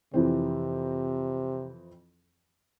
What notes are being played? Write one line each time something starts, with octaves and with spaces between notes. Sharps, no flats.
F2 C3 E3 C4